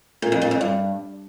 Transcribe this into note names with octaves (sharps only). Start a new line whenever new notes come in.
A#2
F2
A#2
F2
G2